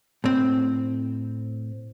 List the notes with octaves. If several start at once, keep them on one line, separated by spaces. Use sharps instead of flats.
A2 C4